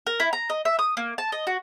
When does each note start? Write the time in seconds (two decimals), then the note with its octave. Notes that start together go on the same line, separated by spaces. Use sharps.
0.07 A#4
0.20 E4
0.33 A#5
0.49 D#5
0.65 E5
0.79 D#6
0.97 A#3
1.18 A5
1.32 D#5
1.47 F#4